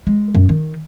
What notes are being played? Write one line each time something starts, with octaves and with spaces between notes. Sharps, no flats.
G#3
F#2
D#3